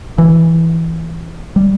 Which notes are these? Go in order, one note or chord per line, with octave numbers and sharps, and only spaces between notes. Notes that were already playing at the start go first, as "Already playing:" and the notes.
E3
G3